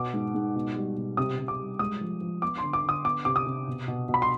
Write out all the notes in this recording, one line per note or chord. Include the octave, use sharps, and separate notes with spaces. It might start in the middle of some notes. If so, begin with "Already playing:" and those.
Already playing: B2 B3 D6
G#2
G#2
B2
G3
B2
C3 D#6
C3
D6
G3
G#3 D#6
F3
F3
B3 D6
D3 C6
D6
D3 D#6
B3 D6
C3 D6
D#6
C3
B2
B2
B2
B5
C6